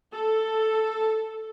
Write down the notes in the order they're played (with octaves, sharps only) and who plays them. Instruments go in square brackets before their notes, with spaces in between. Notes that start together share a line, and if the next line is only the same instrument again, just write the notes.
[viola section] A4